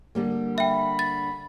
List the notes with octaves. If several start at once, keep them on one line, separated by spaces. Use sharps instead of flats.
D3 G3 A#3
E5 G5 B5
A6